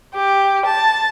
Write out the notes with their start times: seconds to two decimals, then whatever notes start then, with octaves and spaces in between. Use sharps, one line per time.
0.15 G4
0.66 A5